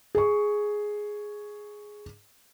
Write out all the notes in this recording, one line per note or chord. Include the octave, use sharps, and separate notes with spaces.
G#4 C#6